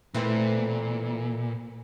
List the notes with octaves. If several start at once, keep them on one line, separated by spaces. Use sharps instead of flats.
A#2 E3 A3 C4